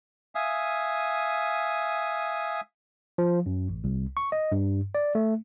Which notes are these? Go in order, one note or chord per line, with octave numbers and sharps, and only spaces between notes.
E5 F5 G#5 D#6
F3
F#2
A1
C2
C#6
D#5
G2
D5
A3